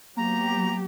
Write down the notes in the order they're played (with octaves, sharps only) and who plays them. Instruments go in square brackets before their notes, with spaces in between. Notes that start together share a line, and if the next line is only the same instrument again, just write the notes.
[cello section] F#3 B3 G4 [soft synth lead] A#3 [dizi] A#5